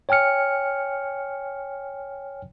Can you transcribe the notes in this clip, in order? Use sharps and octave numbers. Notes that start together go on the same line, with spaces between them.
C#5 G5 G#5 F6 C#7